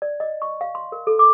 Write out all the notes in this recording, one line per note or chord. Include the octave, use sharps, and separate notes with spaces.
D5
D#5
C#6
F5
C6
A#4
A4
D6